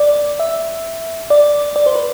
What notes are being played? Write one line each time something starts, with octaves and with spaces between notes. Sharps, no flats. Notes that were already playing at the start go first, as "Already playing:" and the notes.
Already playing: D5
E5
D5
D5
C5
B4